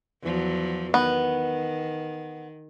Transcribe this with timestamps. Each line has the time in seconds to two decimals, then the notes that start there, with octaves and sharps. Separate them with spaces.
0.23 E2 F3 F#3
0.94 D#3 B3